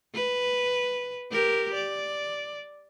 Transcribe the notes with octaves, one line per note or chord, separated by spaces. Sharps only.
B4
G4 A#4
D5